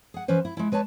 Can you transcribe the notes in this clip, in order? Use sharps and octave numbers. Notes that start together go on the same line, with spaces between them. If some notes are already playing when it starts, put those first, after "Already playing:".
G#4 F#5
E3 C#4 B4 C5
E4
G#3 E4
G#3 B4 C#5 A5